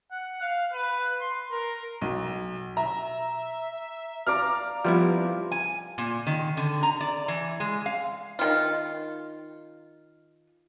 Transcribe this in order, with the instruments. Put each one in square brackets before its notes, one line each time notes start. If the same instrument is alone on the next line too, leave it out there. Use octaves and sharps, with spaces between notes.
[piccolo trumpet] F#5
F5
B4
C6
A#4
[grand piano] B1
[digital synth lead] E5 [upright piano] A#5
[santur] D5 F5 A#5 [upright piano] F6
[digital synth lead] F3 [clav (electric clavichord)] G3 B3 E4 [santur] F4
[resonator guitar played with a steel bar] G#5
A#2
D#3
D3
A#5
D5
E3
G#3
F5
[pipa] D#3 F4